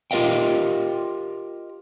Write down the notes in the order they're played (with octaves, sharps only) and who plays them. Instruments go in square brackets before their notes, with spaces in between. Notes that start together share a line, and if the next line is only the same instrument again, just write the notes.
[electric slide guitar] F4 G4 A#4 D#5 F5 G5